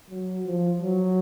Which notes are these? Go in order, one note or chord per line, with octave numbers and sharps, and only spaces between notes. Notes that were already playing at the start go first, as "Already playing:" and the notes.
F#3
F3
F#3